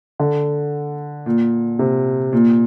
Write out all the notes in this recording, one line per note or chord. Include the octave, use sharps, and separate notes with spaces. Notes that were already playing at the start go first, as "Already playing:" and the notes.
D3
A#2
C3
A#2